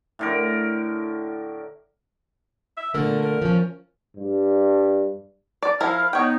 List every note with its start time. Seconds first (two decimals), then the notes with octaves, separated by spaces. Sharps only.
0.19 A2 D3 A#4
2.77 E5
2.94 A#2 D3 A3 A#4
3.22 A#4
3.42 F3 C#4
4.17 G2
5.62 D5
5.81 F3 E4 A#4 F5 B5 F6
6.13 B3 D#4 C#5 G5